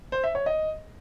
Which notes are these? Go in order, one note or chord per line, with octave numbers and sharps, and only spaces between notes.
C5
E5
C#5
D#5